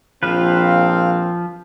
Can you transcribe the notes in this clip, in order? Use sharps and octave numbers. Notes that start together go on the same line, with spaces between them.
A#1 F3 C4 B4 F5